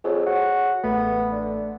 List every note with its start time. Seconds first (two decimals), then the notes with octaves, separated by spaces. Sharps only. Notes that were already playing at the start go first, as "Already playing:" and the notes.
0.04 F2 G#4 C#5
0.26 F#4
0.84 A1 A3 B3
1.32 D3